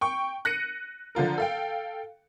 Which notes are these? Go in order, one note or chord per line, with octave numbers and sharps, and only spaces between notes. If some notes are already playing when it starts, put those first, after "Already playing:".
G5 C#6
F#6 A#6 C#7 D#7
D3 F3 F4 A#4
A4 F5 G5